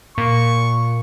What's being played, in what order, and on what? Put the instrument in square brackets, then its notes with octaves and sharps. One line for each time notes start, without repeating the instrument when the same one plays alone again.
[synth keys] A#2 [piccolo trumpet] C#6